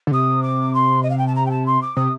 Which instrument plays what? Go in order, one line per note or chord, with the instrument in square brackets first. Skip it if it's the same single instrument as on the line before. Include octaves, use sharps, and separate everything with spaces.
[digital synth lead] D3
[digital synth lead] C3 [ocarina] D#6
[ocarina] D6
C6
D#5
F5
G5
A5
A#5
G5
A5
C6
D6
[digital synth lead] C3 [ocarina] D#6